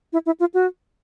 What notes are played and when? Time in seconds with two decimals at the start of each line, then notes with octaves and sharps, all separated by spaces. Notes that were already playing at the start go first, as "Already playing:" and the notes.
0.13 E4
0.26 E4
0.40 F4
0.54 F#4